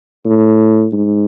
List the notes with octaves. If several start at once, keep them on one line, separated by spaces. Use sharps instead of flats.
A2
G#2